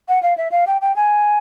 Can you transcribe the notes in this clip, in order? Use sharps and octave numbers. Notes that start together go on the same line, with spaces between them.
F#5
F5
E5
F5
G5
G5
G#5